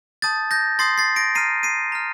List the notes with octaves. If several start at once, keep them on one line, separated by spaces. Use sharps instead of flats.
A5 D#6 G6 A6
G6 A#6
C6 D#6 G6 A6 C7
A6 C7
A#6 D7
A#5 F6 C7 D#7
C7 D#7
A#5 F6